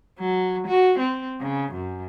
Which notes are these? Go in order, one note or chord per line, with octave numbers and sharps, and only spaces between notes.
F#3
F#4
C4
C#3
F#2